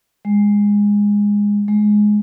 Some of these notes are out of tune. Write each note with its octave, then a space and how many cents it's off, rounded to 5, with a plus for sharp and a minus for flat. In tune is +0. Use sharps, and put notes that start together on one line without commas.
G#3 -15
G#3 +10